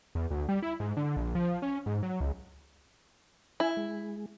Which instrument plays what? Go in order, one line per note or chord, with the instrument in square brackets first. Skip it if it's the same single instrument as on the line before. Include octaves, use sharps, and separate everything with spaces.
[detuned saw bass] E2
D2
G3
E4
G#2
D3
A#1
F3
C#4
G#2
F#3
C#2
[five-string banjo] E4 [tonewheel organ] E5 G#5
[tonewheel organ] G#3